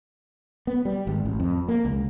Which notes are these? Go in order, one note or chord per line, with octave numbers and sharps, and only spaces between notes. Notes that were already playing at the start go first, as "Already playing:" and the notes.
B3
G3
G#1
A1
F2
A#3
C#2